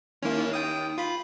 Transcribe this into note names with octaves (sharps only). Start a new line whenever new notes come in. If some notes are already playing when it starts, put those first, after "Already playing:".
D#2 A#3 C#4 E4
G5 D#6
F4 B5